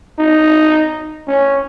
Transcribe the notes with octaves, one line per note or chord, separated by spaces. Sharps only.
D#4
C#4